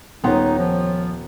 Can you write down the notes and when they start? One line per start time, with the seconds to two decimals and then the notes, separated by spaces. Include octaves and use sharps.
0.24 D#1 B3 D#4 C#5 G5 C6
0.58 F3